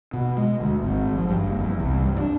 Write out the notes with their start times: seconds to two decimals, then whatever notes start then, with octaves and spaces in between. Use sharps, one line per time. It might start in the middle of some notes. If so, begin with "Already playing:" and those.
0.13 B2
0.37 G#3
0.61 D2
0.83 G#1
1.15 F3
1.29 G2
1.46 F#1
1.60 E2
1.80 C2
2.05 G2
2.20 D4